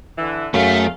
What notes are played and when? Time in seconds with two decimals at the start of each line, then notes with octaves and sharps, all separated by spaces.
0.16 D3 E3
0.54 F#2 A3 G#4 A4 F5